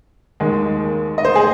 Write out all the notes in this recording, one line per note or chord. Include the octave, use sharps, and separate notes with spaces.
D#2 D#3 G#3
D#5
C5
G#4